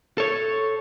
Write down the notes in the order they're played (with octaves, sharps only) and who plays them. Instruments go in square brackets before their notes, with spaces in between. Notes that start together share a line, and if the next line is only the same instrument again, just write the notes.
[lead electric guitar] A4 C#5